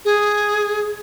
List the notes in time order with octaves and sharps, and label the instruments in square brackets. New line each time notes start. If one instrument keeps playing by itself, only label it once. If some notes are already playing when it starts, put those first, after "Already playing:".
[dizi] G#4